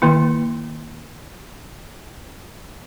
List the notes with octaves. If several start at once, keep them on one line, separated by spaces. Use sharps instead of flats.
D#3 A#3 E4